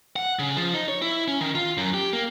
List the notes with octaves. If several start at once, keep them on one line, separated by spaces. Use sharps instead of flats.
F#5
C#3
F3
D#4
C#5
E4
C#4
D#3
F4
F#2
G4
A#3